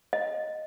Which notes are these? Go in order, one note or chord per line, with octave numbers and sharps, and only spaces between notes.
D#5